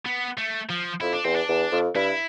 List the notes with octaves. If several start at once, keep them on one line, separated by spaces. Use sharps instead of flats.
B3
A3
F3
F2 E4
D4
E2 C4
D4
E2
F2
G2 E4